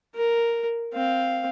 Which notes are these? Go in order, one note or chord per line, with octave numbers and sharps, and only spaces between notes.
A#4
C4 F5